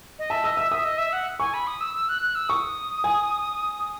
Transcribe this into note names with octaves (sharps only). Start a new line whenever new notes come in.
D#5
E5 A5
D#5 E6
E5 E6
E5 D#6
D#5
E5
F#5
G#5 C#6
B5
D#6
E6
E6
F#6
F#6
E6
C#6 D#6
G#5